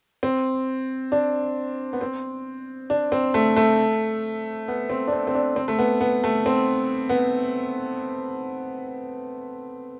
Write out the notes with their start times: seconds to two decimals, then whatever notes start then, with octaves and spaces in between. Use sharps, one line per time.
0.23 C4
1.12 D4
1.93 B3
2.01 C4
2.90 D4
3.12 C4
3.34 A3
3.56 A3
4.68 B3
4.90 C4
5.07 D4
5.12 C4
5.27 C4
5.35 D4
5.56 C4
5.68 A3
5.79 B3
6.01 B3
6.24 A3
6.46 C4
7.09 B3